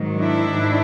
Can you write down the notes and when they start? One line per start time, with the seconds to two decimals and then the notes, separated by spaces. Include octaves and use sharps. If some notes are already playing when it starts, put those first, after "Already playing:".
Already playing: G#2 D#3 F#3
0.19 D4 E4
0.50 G#2 D#3